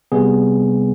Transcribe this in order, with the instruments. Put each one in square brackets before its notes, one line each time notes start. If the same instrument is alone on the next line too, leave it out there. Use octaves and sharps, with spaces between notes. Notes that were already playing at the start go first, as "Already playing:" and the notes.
[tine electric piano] C3 G3 B3 G#4